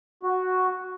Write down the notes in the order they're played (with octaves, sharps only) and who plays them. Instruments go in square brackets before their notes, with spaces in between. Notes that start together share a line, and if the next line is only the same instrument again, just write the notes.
[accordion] F#4